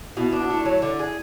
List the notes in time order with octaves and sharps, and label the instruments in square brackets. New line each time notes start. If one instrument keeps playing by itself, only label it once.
[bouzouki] B2 [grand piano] E4
[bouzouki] D4
[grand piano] F#4
[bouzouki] A3 [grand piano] E4
[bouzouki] F#3
D3
G#4